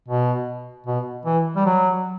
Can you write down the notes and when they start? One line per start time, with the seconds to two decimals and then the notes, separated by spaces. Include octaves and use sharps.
0.08 B2
0.87 B2
1.26 E3
1.56 G3
1.66 F#3